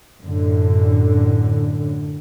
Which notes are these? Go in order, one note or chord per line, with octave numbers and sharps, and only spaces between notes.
F#2 A2 D3